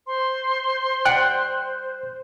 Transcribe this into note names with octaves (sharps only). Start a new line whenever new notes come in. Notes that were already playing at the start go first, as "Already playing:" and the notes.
C5 C6
G3 F#5 G5 F#6